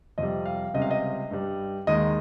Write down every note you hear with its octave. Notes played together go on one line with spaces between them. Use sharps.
F2 C3 G3 D#5
F5
C#2 C3 G3 D#5
F5
D#5
G2 G3
D#2 D#3 G#3 D#5